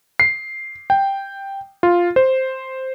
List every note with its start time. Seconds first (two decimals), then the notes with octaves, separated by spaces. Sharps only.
0.20 C7
0.90 G5
1.83 F4
2.16 C5